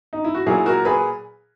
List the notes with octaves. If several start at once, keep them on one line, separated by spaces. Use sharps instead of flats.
D#4
E4
F#4
A#2 F#3 E4 G#4
F#4 A#4
G#4 B4